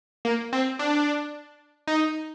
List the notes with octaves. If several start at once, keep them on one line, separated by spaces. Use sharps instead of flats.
A#3
C4
D4
D#4